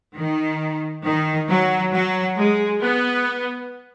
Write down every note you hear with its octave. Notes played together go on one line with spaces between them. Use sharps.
D#3
D#3
F#3
F#3
G#3
B3